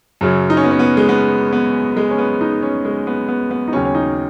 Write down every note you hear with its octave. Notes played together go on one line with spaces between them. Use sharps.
F#2 C#3 F#3
D#4
C#4
B3
C#4
B3
G#3
B3
B3
G#3
C#4
B3
D#4
C#4
G#3
B3
B3
B3
D#4
D#2 C#3 F#3 C#4
C#4
D#4